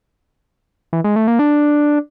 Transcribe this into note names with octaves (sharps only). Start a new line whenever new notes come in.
E3
G#3
A3
A#3
D4